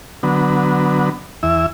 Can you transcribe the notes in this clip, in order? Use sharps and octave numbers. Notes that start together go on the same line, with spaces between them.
D3 F#3 B3
E2 E4 E5